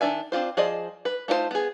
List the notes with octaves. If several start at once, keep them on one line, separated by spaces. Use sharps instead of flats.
D#3 F#3 D4 E5 G#5
C4 D4 F4 C5
F3 G#4 C5 D5 D#5
B4
A3 D#4 F4 G#4 C5
B3 G#4